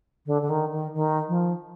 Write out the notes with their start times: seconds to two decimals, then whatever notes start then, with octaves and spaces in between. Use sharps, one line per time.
0.26 D3
0.42 D3
0.49 D#3
0.71 D#3
0.94 D#3
1.28 F3